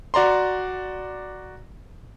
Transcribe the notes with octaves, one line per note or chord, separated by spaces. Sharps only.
F#4 D5 A#5 C6